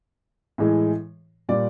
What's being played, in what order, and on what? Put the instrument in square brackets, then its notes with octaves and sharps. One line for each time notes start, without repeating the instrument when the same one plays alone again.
[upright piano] A2 E3 G#3
A#2 G3 D5